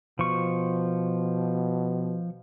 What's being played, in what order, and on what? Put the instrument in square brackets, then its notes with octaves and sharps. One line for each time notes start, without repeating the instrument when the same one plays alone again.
[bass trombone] B2 [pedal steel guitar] F3 C#6